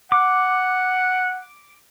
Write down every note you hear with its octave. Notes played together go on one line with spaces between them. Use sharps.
F#5 D6